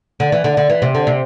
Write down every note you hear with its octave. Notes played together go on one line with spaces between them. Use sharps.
D3
E3
D3
D3
E3
C3
D3
C3